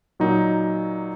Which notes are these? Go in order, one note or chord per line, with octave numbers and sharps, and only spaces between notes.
A#2 F#3 D#4